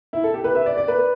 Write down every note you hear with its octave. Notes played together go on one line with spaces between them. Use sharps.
E4
A4
G4
B4
E5
D5
D5
B4